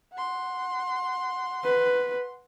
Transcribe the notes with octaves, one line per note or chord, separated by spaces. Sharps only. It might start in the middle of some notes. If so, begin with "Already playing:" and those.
F#5 C6
B4